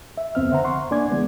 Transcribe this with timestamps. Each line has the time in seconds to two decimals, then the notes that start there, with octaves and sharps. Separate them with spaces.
0.17 E5
0.35 C2 F2 B3 C4 E5 F6
0.50 D3 C5 F#5 A#5
0.64 F#5 C6 C#6
0.91 A#3 D4 D5 G#5 D6 G#6
1.10 E3 G#3 B3